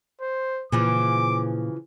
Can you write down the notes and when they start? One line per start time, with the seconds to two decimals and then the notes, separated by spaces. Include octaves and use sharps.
0.21 C5
0.72 A#2 C#3 E3 F3 D6